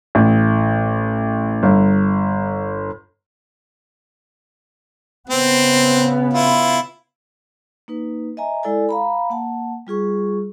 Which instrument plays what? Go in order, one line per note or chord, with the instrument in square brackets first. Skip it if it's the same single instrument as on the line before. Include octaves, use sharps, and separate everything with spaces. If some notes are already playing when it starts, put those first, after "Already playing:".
[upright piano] A1
G1
[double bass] C#3 B3 [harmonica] C4
[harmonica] E4 F4
[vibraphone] A#3 D#4 B4
D#5 E5 G#5 A#5
G#3 E4 A4 D5 G#5
F5 A#5 B5
A#3 F#5 A5
G3 F4 G#4 C#6